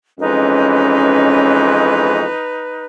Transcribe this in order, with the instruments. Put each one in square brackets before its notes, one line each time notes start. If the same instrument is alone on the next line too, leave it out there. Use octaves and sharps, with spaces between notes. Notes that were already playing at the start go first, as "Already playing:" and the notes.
[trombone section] F2 E3 G#3 [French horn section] C#4 [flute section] D#4 B4